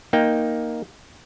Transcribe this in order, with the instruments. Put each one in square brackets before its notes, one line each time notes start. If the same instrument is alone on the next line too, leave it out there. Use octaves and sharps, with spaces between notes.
[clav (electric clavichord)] A#3 D#4 G5